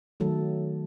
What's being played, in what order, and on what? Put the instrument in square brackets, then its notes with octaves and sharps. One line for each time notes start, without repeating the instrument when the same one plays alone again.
[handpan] D#3 F#3 A3 A4